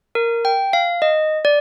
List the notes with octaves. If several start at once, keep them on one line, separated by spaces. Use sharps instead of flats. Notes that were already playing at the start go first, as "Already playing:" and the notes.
A#4
G5
F5
D#5
D5